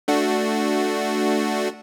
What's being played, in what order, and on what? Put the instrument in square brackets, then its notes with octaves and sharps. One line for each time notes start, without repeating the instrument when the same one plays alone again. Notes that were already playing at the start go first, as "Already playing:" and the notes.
[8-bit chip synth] A3 D4 F#4